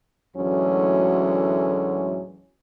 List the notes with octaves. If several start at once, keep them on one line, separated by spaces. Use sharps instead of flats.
D2 A2 E3 F#3 G#3 C#4